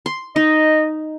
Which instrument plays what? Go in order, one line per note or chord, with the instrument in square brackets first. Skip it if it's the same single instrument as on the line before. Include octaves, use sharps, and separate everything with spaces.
[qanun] C6
[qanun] D#4 [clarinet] D#5